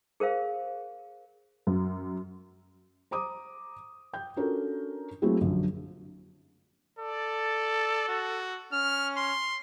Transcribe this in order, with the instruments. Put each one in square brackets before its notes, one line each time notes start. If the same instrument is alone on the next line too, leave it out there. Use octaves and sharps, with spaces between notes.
[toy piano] G#4 A#4 C5 F5
[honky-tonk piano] F#2
[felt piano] C5 A#5 D6 D#6
G5 G6
C#4 D4 F4 F#4 A4 A#4
F#3 A3 A#3 C4 E4 G#4
A#1 F#2 D3 F#3
[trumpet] A4 [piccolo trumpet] D5
[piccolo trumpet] F#4
[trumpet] C#4 [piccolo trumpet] F6
[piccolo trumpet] C6